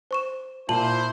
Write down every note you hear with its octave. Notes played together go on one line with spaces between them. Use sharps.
C5 C#6 E7
A#2 A#3 E4 C5 A5 F#7